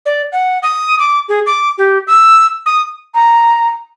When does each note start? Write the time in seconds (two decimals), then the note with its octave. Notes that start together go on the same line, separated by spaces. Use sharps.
0.06 D5
0.32 F#5
0.63 D#6
0.99 D6
1.29 G#4
1.46 D6
1.78 G4
2.07 E6
2.66 D#6
3.15 A#5